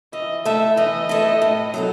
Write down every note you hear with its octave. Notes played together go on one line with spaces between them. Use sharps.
E3 D#5
A3 E4 A4 E5
E3 D#5
A3 E4 A4
A2
F#3 B3 D#4 A4